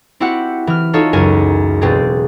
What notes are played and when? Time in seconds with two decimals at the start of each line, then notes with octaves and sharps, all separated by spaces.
0.20 C4 E4 F#4 G4 F#5
0.67 E3 F6
0.93 D#4 F4 F#4 A4 C#5
1.13 C#2 F#2 A#4 G#5
1.81 E1 B2 C4 G4 G#4 A6